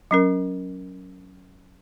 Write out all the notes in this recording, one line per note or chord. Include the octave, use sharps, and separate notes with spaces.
F#3 C#4 A#4